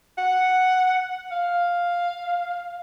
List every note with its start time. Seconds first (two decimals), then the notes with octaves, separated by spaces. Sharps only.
0.18 F#5
1.32 F5